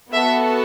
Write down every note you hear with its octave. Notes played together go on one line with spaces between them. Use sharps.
B3 F#4 A4 E5